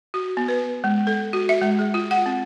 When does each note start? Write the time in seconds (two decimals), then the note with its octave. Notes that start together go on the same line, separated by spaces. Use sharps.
0.14 F#4
0.37 B3
0.48 B4
0.84 G#3
1.07 A4
1.33 F#4
1.49 E5
1.62 G#3
1.79 G#4
1.94 F4
2.11 F#5
2.26 C4